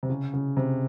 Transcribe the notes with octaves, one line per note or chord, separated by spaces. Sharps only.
C3
C#3
C#3
C3